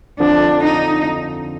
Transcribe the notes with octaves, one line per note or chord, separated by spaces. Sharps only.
F2 D3 F3 D4
D#4